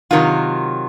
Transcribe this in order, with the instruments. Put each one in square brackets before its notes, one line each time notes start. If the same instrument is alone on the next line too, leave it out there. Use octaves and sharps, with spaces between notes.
[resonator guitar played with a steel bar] C3 D#3 F#3 F4